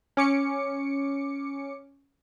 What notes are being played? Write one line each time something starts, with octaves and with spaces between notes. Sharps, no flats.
C#4 D6 C#7